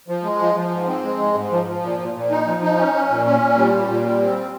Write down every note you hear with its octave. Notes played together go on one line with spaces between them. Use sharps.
F3
G#3
F3
F3
G#2
C4
G#3
G#2
G#2
F3
F3
A#2
A#2
A#2
D#4
F3
D#4
C#4
C#4
A#2
C#4
A#2
G3
A#2
A#2
G3
C4